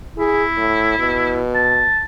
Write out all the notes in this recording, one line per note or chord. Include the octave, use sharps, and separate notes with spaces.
E4 G#4
A2
B2
A5